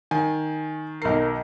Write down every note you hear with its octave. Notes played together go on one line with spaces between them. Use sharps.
D#3 G#5
B1 A#4 C7